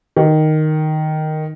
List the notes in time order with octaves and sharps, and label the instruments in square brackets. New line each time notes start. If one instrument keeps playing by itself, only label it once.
[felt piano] D#3